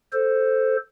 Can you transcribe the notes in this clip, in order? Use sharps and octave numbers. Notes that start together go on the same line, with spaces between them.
A4 C5